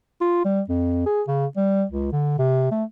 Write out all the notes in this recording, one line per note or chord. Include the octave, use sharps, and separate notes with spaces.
F4
G3
F2
G#4
C#3
G3
C#2
D3
C3
A3